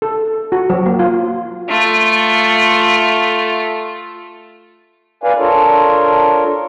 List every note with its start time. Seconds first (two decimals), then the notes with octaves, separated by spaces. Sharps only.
0.02 A4
0.52 F#4
0.70 F#3
0.86 A#3
0.99 F4
1.69 A3 F4
5.23 B4 D5 F5 G#5
5.38 D4 F4 A4 A#4 C#5